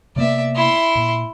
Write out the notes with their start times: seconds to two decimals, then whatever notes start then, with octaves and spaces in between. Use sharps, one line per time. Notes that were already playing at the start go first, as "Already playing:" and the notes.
0.16 C3 A#3 B3 D5 E5
0.55 E4 C6
0.95 A#2